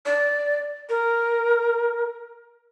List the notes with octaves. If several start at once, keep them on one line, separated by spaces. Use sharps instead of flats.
D5
A#4